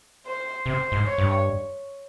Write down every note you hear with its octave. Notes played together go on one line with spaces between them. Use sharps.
C5
C3 C5
G#2
C#5
G2